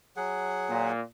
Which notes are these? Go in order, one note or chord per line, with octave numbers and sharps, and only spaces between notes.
F#3 G#4 F#5
A#2